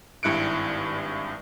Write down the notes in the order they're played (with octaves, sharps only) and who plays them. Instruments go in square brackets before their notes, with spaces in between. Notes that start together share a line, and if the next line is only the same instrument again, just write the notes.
[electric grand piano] G#1 G2 E4 F#6 C#7 D7